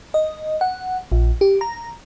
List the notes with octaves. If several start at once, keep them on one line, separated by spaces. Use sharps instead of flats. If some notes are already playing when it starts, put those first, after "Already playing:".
D#5
F#5
A#1
G4
A#5